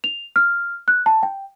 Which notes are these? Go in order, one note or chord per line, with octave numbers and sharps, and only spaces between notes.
F7
F6
F#6
A5
G5